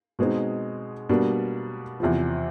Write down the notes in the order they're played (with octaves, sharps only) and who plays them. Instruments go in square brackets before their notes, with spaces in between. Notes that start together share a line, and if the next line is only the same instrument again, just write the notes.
[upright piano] B2 G#3 C4 D#4
B2 G3 A#3 D4
E2 C3 F3